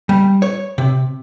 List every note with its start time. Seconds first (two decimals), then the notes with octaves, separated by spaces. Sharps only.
0.09 G3
0.42 C#5
0.78 C3